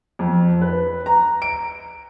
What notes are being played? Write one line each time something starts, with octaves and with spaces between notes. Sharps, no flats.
F2
B4
A#5
D7